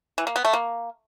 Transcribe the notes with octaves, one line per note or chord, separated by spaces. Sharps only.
E3
A#3
B3
A3
A#3